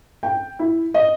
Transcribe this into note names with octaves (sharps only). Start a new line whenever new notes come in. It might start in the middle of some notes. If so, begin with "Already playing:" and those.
G5
E4
D#5